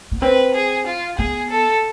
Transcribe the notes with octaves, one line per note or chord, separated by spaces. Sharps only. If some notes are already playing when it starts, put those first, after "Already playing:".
B3
C4 B4
G#4
F4
B3 G#4
A4